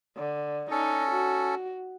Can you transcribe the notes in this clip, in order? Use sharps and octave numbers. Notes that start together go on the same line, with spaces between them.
D3
C#4 D#4 A4
F#4